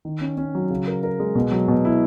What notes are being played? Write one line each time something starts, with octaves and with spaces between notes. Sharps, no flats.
D#3
C#4
C#4
F#3
C#3
A#4
A#4
G#3
B2
F#3
B2
E4